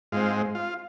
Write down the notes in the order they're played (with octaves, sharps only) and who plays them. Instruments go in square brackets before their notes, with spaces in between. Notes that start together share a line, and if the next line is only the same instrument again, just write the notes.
[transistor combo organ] G#2 G#3 C4 F4
F4